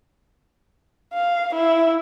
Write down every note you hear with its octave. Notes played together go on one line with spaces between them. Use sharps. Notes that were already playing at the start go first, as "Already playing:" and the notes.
F5
E4